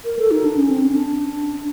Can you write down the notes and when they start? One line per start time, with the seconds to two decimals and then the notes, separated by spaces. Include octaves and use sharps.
0.05 A#4
0.19 A4
0.31 D#4
0.45 D4
0.57 C#4
0.70 C4
0.83 C#4
0.96 D4